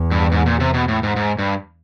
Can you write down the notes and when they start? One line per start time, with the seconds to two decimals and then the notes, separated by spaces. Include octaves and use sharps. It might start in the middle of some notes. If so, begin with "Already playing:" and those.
Already playing: E2
0.11 G2
0.32 G#2
0.46 A#2
0.60 C3
0.74 B2
0.88 A2
1.03 G#2
1.16 G#2
1.39 G2